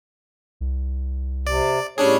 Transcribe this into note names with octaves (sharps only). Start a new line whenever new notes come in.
C2
C3 D5
A2 G3 C#4 D4 G#4 C#5